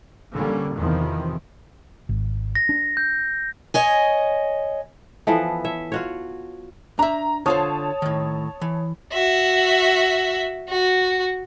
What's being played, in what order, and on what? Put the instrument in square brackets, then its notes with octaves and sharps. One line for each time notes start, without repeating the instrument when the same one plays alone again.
[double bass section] D3 G3 A#3 C#4
E2 C3 D#3 F3
[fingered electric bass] G#1
[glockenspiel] A#6
[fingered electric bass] D4
[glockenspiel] G6
[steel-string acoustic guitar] C#5 D#5 G#5
[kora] E3 F3 B3 A4
C#5 E5
F4 F#4 C#5
[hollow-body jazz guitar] D4 E5 [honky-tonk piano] A#5
[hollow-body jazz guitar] D3 F4 C5 [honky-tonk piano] C#5 A5 D#6
[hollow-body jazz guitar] A2 D#3
E3
[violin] F#4 E5
F#4